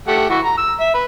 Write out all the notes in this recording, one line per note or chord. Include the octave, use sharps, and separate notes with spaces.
A3 G4 F#5
E3 F#4
A#5
E6
E5
B4